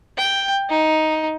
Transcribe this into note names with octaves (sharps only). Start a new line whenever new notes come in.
G5
D#4